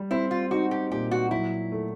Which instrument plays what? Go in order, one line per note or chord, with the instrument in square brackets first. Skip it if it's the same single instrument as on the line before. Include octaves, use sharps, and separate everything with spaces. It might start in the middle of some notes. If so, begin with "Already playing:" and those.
Already playing: [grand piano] G3
[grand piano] C4 [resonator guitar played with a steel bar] E4
[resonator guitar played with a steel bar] F4
[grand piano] D#4 [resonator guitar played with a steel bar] F#4
[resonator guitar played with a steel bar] G4
[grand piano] A#2 [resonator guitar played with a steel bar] G4
[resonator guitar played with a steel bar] F#4
[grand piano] F#3 [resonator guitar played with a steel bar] E4
[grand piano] A3